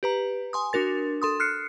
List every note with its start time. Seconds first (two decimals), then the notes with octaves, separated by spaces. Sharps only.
0.03 G4 B4 A#5
0.53 G#5 C6 D#6
0.73 D4 F#4 A#4 A6
1.22 A4 C6 D#6
1.40 F6 F#6 C7 C#7